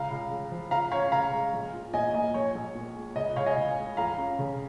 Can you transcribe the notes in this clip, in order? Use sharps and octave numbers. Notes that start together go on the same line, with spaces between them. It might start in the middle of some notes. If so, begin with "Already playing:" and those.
Already playing: C#2 F5 A#5
C#2
C#3
F3
C#2 F5 A#5
C#4 C#5 F5
C#3 F5 A#5
G#3
A#1
F4
A#2 D#5 G#5
A#3 D#5
A#1 C#5
A#1
A#2
G#3
C#2 D#5
C#2 C#5 F5
D#5 G#5
C#3
G#3
F2 F5 A#5
C#4
C#3